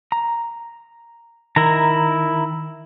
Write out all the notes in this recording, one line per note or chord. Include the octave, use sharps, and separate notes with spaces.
A#5
D#3 E4 A#4 A#5